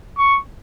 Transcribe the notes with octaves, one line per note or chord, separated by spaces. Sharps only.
C#6